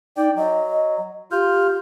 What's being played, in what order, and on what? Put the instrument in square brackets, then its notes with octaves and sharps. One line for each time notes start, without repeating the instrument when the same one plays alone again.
[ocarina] D#4 [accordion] D5 G5
[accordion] F#3 [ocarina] D#5
[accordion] F4 F6 G6 [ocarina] G4